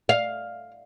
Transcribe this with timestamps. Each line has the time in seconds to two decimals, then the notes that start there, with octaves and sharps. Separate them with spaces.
0.09 F5